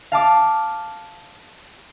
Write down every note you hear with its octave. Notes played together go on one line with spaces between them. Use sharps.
F5 A5 D6 F6